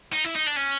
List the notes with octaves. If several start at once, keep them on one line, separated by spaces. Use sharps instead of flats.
D#4
E4
D#4
D4
C#4